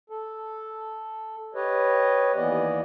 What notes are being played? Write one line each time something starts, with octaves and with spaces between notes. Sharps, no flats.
A4
G4 B4 C#5 D#5
D#2 E3 B3 D5 D#5